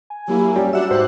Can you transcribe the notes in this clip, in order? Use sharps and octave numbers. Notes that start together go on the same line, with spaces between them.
G#5
F#3 A#3 E4 G4
G3 C#4 G4 D5
D4 F#4 E5 F#5 E7
G#2 G4 C5 F#6